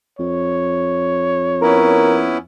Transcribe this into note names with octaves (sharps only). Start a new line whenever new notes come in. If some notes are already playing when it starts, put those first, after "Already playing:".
F2 C#5
B3 C#4 E4 A#4